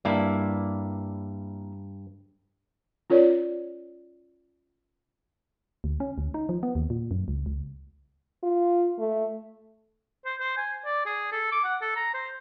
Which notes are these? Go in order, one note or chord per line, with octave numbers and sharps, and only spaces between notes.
G2 A#3 E4 D5
C#4 F4 A#4 C#5 D5
D2
C#4
D2
D#4
F3
B3
D#2
A#2
F#2
C#2
C#2
F4
A3
C5
C5
G#5
D5
G#4
A4
D6
F#5
A4
A#5
C5